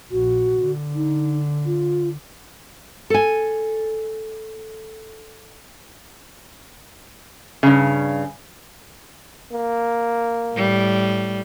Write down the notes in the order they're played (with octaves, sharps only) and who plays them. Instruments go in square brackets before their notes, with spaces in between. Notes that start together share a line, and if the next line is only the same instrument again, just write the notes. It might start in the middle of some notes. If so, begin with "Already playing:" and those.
[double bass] A#1 [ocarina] F#4
[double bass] D3
[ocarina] D#4
F4
[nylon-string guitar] A4 G#5
[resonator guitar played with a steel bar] G2 C#3
[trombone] A#3
[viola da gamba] A2 G3